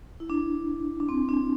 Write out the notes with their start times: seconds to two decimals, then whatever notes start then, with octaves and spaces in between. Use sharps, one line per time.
0.20 E4
0.30 D4
1.00 D4
1.09 C4
1.29 D4